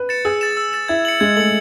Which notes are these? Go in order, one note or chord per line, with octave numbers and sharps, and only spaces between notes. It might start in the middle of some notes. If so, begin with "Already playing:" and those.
Already playing: B4
A6 C#7 E7
G#4 E6
A6 E7
E6
A6 E7
E4 G#6
C#7 F#7
G#3 G#6
A3 C#7 F#7